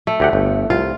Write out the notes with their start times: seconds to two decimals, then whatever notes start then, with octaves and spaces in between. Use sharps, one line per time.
0.07 A3
0.20 D2 G4 F#5
0.33 G1
0.70 C2 F4